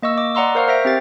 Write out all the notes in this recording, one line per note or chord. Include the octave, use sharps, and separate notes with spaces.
A#3 D#5 C#6 E6
D#5 D6
D5 F#5 A#5 C6 E6
A#4 C5 F5 C#6 F6
C5 E5 A#6 D7
C4 G4 A6